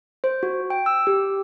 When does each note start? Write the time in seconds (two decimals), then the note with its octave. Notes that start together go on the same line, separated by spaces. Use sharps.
0.24 C5
0.43 F#4
0.70 G5
0.86 E6
1.07 G4